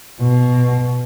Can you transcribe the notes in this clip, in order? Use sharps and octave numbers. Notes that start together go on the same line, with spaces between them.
B2